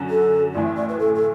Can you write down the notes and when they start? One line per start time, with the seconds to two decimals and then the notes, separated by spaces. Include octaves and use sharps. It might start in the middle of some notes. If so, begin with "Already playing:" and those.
Already playing: F#2 D3 F#3
0.09 A4
0.54 A1 A2 E3 D5
0.76 D5
0.88 B4
0.99 A4
1.15 A4